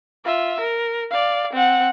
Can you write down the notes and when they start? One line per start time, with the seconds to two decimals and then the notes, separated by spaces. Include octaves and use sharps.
0.25 F4 E5
0.60 A#4
1.10 D5 F5
1.53 C4 F#5